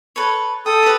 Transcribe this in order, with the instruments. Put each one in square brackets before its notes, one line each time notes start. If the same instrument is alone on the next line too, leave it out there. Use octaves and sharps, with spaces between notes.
[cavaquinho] A4 B4 C#5
[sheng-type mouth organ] A4 D#6 [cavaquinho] G5
[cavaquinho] G4 B4